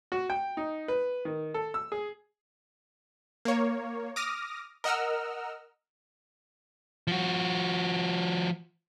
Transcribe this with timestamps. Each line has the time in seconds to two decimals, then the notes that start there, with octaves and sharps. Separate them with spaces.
0.12 F#4
0.30 G5
0.57 D#4
0.88 B4
1.25 D#3
1.54 A4
1.74 E6
1.92 G#4
3.45 A#3 C#5
4.16 D6 D#6 F6 A#6
4.84 A#4 D#5 F#5 E6 F6
7.07 F3 F#4